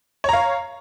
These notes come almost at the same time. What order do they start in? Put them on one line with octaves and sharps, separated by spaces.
C#5 A#5 F5